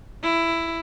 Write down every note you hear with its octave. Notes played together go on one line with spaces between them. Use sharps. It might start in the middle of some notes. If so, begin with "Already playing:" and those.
E4